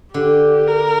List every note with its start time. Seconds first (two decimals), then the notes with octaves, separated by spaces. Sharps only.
0.14 D3 G4
0.68 A#4